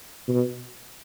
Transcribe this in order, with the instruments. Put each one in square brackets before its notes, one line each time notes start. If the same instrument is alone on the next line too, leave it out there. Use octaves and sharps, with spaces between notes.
[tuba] B2